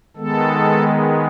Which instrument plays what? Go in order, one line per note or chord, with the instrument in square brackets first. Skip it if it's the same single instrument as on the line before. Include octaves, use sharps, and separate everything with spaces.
[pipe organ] D#3 G#3 B3 A4